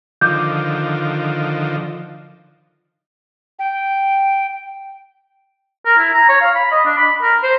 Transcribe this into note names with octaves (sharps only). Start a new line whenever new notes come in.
D3 D#3 F3 D6 G6
G5
A#4
E4
A#5
C#5
F5
B5
D#5
D4
B5
A#4
C5